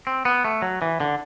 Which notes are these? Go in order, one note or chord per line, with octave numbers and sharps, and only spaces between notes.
C4
B3
A3
F#3
E3
D3